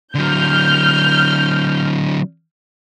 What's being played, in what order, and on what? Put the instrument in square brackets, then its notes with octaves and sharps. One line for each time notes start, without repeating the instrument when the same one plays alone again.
[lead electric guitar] D3 F#3 [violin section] F6 G6